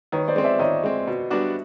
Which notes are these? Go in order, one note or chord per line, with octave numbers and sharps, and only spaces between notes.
D#3 B4 C#5
C5 D5
G#3 C4
D5 E5
D#3 C#5 D#5
G#3 C4
B2
G3 B3 D4 F#4